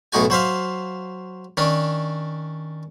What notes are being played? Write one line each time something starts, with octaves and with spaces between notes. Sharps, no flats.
B1 A2 D#4 F#4 G#5
F#3 C5 E5 F5
D#3 C#4 D4